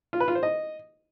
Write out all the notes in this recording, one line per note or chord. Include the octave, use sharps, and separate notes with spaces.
F4
B4
F4
C5
D#5